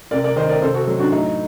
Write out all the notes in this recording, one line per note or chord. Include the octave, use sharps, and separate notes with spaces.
C3 A#4 D5
A#4 D5
D#3 C5 D#5
A#4 D5
C3 A4 C5
F#4 A4
F#3
D4 F#4
A2 D#4